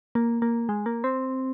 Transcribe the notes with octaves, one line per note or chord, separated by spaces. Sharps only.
A#3
A#3
G#3
A#3
C4